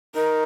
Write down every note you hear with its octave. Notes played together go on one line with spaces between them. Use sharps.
D#4 A#4